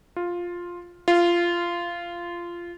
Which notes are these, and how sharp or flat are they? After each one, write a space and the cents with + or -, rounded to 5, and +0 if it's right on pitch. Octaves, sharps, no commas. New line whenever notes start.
F4 +5
F4 -15